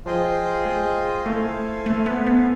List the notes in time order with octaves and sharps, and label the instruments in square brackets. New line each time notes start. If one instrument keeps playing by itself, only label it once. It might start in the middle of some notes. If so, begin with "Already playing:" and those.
[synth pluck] F3 [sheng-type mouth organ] F4 G#4 C5 D#5 G5
[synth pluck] G#3
[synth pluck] A3 [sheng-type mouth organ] E4 A4 C5 F5 G#5
[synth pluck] A3
B3
B3